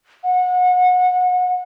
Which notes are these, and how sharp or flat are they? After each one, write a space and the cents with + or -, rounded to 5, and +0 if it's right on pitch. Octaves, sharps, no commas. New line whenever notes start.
F#5 -30